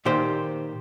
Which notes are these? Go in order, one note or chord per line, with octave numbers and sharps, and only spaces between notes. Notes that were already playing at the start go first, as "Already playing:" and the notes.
A#2 D#3 G4 C5